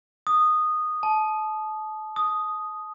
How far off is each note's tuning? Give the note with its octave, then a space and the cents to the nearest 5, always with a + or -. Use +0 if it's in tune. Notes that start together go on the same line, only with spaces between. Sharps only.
D#6 -10
A5 -30
D#6 +0